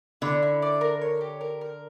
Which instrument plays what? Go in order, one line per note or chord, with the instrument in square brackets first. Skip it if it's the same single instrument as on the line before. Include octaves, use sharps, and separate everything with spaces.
[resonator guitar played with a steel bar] D3 [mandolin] E4
[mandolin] E4
D5
A#4
C#5
G4
A#4
A#4